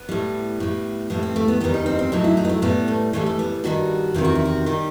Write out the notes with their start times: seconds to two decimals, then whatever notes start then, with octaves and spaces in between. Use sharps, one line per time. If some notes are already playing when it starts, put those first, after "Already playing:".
Already playing: B3
0.09 A2 G3
0.60 A2 G3
1.10 A2 G3 B3
1.23 C4
1.36 A3
1.48 B3
1.60 E2 D#3 G3 B3
1.74 D#4
1.86 C4
1.99 C4
2.12 A2 F#3 D#4
2.24 E4
2.37 D#4
2.45 B3
2.49 A3
2.62 A2 G3 B3
2.88 A3
3.13 A2 E3 G3 A3
3.26 A3
3.39 B3
3.64 G2 D#3 G3 F#4
4.14 E2 C3 D#3 G4
4.25 F#4
4.35 E4
4.45 F#4
4.66 D#3 G3 G4